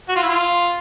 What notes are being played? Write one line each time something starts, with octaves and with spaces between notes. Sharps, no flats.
F#4
F4
E4
F4